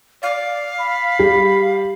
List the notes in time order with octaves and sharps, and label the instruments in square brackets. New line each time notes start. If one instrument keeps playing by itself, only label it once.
[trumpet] D5 [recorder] F5
[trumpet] B5
[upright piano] G3